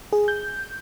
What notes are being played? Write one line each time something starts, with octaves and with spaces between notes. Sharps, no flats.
G#4
G6